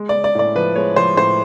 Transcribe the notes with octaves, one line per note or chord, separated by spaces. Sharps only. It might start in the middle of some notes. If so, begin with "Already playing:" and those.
Already playing: G#3
D5
G#3
D5
A2 D5
F3 B4
G#3 C#5
F3 C5
A2 C5